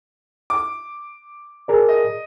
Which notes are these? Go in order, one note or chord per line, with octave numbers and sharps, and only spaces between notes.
D6
G#4 A#4 D5
D#5